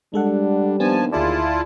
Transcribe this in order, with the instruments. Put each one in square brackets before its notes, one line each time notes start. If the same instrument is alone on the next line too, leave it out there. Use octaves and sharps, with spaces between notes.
[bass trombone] G3 [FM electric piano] G#3 A4 F#5 [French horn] D4
[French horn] D#2 [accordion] F3 G#5 A5 [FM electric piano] B3 D4
[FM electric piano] D2 G#4 D5 [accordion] E4 F4 A5